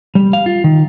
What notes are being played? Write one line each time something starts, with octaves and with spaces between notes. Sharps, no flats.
G3
F5
F4
D#3